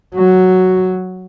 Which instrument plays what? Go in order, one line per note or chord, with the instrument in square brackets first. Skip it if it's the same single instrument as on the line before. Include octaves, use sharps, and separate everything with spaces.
[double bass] F#3 [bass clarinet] F#4